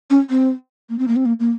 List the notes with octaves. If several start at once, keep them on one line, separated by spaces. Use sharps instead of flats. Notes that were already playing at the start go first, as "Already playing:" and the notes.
C#4
C4
A#3
C4
A#3
C4
A#3
A#3